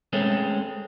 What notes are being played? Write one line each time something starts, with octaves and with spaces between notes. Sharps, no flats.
G#3 A3 C4 C#4